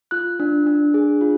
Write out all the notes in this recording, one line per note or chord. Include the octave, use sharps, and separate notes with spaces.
F4 F#6
D4
D4
G#4
F4